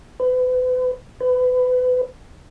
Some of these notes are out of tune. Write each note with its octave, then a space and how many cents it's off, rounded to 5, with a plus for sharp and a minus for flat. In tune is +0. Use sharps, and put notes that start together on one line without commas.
B4 +40
B4 +30